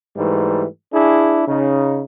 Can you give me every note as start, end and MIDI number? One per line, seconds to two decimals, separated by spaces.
0.16 0.65 44
0.16 0.65 52
0.16 0.65 55
0.16 0.65 57
0.93 1.42 62
0.93 1.42 64
0.93 1.42 68
1.47 2.02 49
1.47 2.02 63